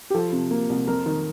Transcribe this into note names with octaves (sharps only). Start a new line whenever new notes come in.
G4
F3 A4
C3
A#3
C2
F2 A#4
D#3